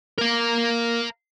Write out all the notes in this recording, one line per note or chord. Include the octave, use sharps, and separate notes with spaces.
A#4 F5